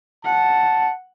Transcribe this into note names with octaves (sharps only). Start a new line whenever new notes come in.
F#5 A5